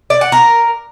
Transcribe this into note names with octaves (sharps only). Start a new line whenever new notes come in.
D5
F#5
A#4